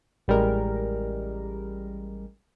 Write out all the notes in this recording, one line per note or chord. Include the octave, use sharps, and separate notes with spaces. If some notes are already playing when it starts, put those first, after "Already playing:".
A1 G3 G#3 A#4